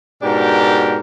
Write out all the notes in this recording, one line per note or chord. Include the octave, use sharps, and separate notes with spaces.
G#2 B2 D4 G4 A#4